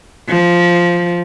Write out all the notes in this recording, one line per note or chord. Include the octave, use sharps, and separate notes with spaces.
F3